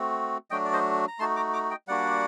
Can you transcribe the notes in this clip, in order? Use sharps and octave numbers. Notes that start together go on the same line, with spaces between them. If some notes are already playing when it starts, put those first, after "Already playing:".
Already playing: A3 C4 F#4
F#3 A3 D4 F#4 D#5 G5
D5
C5 D#5
A#5
A3 D#4 F#4 A5 C6
A#5 D6
A#5 D6
D#5 G5
G3 A#3 D4 F#4 D5 F#5